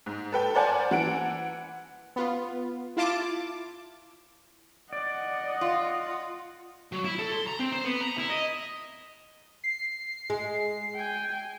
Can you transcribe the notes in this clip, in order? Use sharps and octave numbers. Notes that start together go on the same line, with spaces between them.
G#2
A4 B4 G5
A#4 C5 D5 F#5 G#5 A5
E3 F#5 D7
B3 F4
E4 F4 A5 D6
D5 D#5 F#5
F4
F#3
E4
A4
C6
A#5
C4
C5
B3
A#5
E4
D#5
C7
G#3
G5 G#5